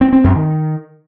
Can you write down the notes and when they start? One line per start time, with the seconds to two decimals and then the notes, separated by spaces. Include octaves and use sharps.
0.01 C4
0.13 C4
0.24 F#2
0.36 D#3